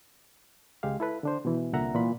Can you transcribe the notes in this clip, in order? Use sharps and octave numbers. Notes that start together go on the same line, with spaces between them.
C#2 G#3 G4 F5
E4 A4 B4
D3 D4 C5
B2 E3
C2 A#2 D3 E5 F#5 A#5
A#2 E3 B5